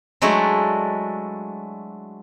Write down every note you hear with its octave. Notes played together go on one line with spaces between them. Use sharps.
F#3 G#3 A3 D4 E4 F#4